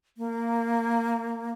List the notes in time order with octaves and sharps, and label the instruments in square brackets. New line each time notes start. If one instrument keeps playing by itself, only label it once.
[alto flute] A#3